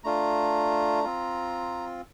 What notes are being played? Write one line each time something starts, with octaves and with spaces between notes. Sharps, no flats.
A3 D4 F4 A#5
C4 F4